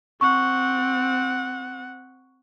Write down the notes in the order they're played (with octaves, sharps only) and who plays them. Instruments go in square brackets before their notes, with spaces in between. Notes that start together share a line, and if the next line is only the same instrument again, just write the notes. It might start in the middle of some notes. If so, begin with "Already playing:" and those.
[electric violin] C4 F#5 [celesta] C#6